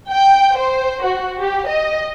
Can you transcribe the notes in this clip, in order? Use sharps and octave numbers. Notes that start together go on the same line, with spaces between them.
G5
C5
F#4
G4
D#5